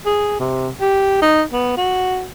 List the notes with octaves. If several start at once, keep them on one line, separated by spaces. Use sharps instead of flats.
G#4
C3
G4
D#4
B3
F#4